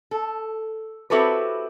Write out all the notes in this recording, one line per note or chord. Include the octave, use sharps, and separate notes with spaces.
A4
C4 E4 F#4 G4 A4 B4